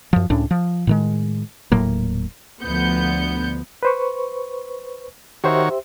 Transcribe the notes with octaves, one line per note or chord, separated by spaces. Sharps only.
F#2 F3
C#2 A2 C#4 D4
F3
A2 D#3 G#3
D#1 A2 F#3 A#3
D2 F3 B3 G6 C#7
B4 C5 C#6
D#3 F#4 G4 C5 C#5 E5